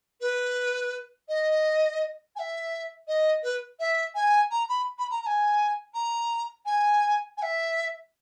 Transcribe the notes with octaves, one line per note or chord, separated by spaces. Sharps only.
B4
D#5
G#5
E5
D#5
B4
E5
G#5
A#5
B5
B5
A#5
A#5
G#5
A#5
G#5
G#5
E5